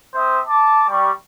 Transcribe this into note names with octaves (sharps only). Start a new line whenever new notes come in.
C4 C5 E5 D#6
A5 D6
G3 C#6